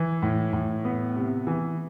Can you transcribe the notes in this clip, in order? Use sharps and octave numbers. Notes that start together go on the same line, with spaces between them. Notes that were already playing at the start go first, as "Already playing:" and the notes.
Already playing: E3
A2
A2
B3
C3
E3